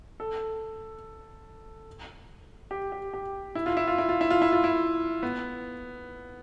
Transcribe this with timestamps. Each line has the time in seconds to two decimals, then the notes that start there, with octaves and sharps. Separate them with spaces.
0.20 A4
2.71 G4
2.92 G4
3.13 G4
3.55 E4
3.66 F4
3.77 E4
3.87 F4
3.98 E4
4.09 F4
4.21 E4
4.30 F4
4.42 E4
4.52 F4
4.64 E4
5.23 B3